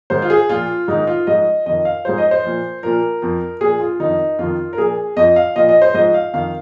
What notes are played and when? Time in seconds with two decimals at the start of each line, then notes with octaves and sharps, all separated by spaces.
0.10 G#2 D#3 C5
0.22 F4
0.30 G#4
0.49 A#2 F3 F4
0.88 G#2 D#3 D#4
1.07 F4
1.27 G#2 F3 D#5
1.66 F2 D#3 D#5
1.85 F5
2.05 G#2 F3 C5
2.18 D#5
2.31 C5
2.44 A#2 F3
2.83 A#2 F3 A#4
3.22 F2 F3
3.61 A#2 F3 G#4
3.80 F4
4.00 F2 D#3 D#4
4.39 F2 D#3 F4
4.73 A#4
4.78 A#2 F3 G#4
5.17 F2 F3 D#5
5.36 F5
5.56 A#2 F3 D#5
5.69 D#5
5.82 C5
5.94 G#2 F3 D#5
6.14 F5
6.33 F2 D#3 F5